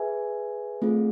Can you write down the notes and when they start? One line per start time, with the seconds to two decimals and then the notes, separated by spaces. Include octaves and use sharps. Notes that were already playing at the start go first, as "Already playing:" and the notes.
Already playing: G#4 B4 E5 G#5
0.82 A3 C4 F4 G#4